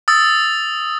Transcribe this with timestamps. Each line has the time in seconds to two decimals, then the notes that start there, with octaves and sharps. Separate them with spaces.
0.08 D#6 E6 A6